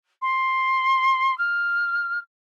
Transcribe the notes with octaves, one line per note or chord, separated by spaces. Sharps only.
C6
F6